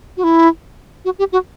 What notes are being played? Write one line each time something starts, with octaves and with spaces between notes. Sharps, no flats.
F#4
E4
F#4
G4
F#4